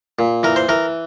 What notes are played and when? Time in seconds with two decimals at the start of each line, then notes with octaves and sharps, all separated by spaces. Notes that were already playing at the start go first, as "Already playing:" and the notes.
0.19 A#2
0.43 E3 A#4
0.56 C5
0.69 E3 A#4